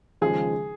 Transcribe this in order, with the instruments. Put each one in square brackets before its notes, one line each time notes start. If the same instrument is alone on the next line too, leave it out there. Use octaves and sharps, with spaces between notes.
[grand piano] D#2 C#3 F3 G#3 [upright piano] G#4